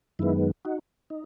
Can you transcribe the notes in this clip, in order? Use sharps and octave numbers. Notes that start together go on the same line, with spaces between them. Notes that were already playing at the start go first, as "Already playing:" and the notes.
F#2 D#3 G#3 B3 E4
D#4 F#4
D#4